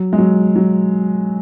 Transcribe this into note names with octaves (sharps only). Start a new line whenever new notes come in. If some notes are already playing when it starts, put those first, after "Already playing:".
Already playing: F#3
G#3
F#3
F#3